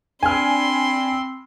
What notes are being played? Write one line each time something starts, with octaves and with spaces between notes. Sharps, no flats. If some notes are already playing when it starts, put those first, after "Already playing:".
C4 D4 G#5 B5 C6 F6